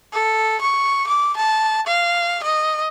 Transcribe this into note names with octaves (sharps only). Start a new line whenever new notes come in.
A4
C#6
D6
A5
F5
D#5